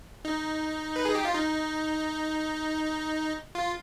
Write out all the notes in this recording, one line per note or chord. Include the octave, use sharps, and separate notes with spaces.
D#4
B4
G#4
G4
F4
D#4
F4